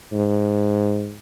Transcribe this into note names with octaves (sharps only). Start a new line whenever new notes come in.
G#2